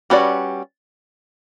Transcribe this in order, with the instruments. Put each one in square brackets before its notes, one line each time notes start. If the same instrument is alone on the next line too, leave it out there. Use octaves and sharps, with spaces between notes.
[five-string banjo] G3 C#4 F#4 B4 D5